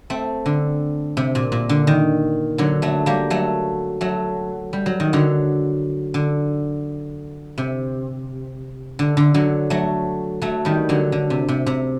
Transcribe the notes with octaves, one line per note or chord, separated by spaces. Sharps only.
A3 C4
D3
C3
A#2
A#2
D3
D#3
D3 F#3
F#3 A3
G3 A#3
F#3 A3
F#3 A3
G3
F#3
D#3
D3 F#3
D3
C3
D3
D3
D3 F#3
F#3 A3
F#3 A3
D#3 G3
D3 F#3
D3
C3
C3
C3